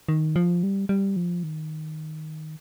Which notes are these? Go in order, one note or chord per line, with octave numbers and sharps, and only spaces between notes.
D#3
F3
G3
G3
F3
D#3